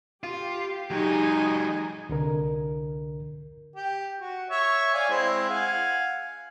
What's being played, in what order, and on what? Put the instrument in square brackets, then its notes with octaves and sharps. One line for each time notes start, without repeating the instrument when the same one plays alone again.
[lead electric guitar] F4 [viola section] G4
[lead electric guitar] F#3 G#3 [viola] D#4 G#5
[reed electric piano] C2 D3 A#4
[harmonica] G4
F#4
C#5 E5
D5 F5 G#5
G#3 C4 E4
F5 F#5 G#5